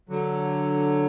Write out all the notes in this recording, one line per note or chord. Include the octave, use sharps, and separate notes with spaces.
D3 F#3